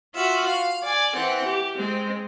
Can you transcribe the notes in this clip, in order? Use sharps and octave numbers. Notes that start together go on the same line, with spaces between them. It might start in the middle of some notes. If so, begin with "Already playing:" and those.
F4 F#4 E5
F5
D5 G#5
E3 C4 F#5
G4
G#3 C4